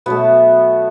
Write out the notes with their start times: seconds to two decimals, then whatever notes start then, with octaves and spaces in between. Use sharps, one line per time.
0.06 B2 F#3 A3 B3